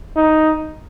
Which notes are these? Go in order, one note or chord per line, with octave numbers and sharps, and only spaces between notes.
D#4